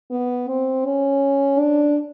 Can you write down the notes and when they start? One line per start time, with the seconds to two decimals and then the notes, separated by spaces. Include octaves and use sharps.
0.11 B3
0.48 C4
0.85 C#4
1.60 D4